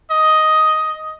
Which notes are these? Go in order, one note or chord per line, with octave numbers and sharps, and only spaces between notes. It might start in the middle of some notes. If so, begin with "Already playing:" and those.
D#5